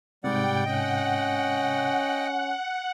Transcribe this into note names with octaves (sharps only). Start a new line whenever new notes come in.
G#2 C3 G3 D5 F#5 G5
C#4 D#5 F#5 G5